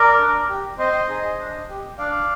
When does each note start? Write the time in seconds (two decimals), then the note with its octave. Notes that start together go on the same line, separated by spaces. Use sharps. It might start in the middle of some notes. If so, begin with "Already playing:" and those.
Already playing: A#4 D5
0.19 D4
0.50 G4
0.78 C4 C5 D#5
1.08 D#4 G#4
1.39 D4
1.69 G4
1.98 D4 D5 F5